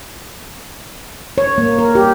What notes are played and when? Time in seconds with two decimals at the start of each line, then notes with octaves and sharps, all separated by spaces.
1.38 C#5
1.58 A#3
1.79 A#4
1.95 G4